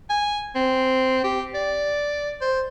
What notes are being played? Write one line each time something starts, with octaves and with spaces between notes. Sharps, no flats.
G#5
C4
G4
D5
C5